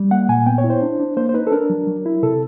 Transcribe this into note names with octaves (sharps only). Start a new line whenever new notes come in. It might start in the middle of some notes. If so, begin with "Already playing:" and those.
Already playing: G3
A#3 F#5
A#2 G#5
B3 G5
C#5
E4
C5
D4
D4
A#3 C5
C5
D#4 B4
A4
D4 A#4
F#3
F#3
E4
C3 A4